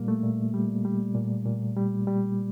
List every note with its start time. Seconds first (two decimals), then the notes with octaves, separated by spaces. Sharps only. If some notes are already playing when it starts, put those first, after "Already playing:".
Already playing: A#2 G3 A#3
0.08 A3
0.23 A#2
0.54 G3
0.85 G3
1.15 A#2
1.46 A#2
1.77 G3
2.07 G3